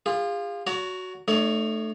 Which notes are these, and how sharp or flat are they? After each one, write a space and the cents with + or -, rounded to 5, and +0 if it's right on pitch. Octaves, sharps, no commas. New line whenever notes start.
F4 +0 G#4 -40
F#4 +0 C#5 +40 A#5 -25
A3 +0 D#4 -40 C#5 +25